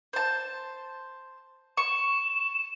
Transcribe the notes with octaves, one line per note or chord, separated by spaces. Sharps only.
C5 A5
C#6 E7